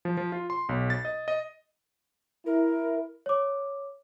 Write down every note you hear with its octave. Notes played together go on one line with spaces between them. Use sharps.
F3
F3
F4
C6
B1
A6
D#5
D#5
E4 A#4
C#5 D6